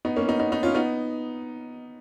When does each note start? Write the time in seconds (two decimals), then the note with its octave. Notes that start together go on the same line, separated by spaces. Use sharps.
0.05 B3 D#4
0.16 A#3 C#4
0.28 B3 D#4
0.39 B3 D#4
0.52 B3 D#4
0.63 C#4 F4
0.75 B3 D#4